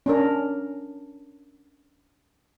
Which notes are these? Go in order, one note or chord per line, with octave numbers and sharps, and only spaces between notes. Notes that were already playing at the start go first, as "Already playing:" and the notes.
C#4 D4 A#4